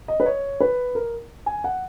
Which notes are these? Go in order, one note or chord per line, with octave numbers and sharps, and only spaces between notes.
D#5
B4
C#5
B4
A#4
G#5
F#5